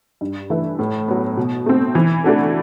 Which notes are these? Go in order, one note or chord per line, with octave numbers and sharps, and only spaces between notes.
G2
E3 A3 E4 B4
A2
F#3 B3
B2
A3 C4
E3
A3 D4 F#4 A4